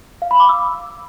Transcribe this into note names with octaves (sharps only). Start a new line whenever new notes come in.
F5
B5
D6
E6